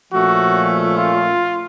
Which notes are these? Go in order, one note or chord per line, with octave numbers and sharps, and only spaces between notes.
A#2 F3 A3 C#4 F#4
F4